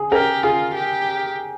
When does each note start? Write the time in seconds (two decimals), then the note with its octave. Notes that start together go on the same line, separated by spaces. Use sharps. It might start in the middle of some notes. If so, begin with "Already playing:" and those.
Already playing: G#4
0.12 G4 A#4
0.43 F4 G#4
0.75 G4